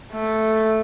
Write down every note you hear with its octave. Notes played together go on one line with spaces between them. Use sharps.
A3